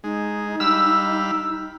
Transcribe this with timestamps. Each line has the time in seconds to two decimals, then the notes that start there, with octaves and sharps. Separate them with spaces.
0.04 G#3 D#4
0.60 G3 F5 B5 E6